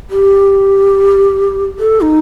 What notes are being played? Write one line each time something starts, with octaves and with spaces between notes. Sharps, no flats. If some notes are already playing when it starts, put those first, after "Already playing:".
G4
A4
D#4